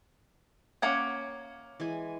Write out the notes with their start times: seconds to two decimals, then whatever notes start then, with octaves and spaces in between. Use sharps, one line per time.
0.82 A#3 C#4 F#5 D6 G#6
1.80 E3 G#3 G#5